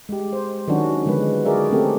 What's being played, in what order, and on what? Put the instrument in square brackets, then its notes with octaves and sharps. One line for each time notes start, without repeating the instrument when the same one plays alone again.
[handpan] G#3 G4
C5
D#3 F#3 C#4 D4 F#4
D3 F3 G#3 B3 B4
F#4 G#4 A#4 D5 E5
A3 C4 C#4 G4 A4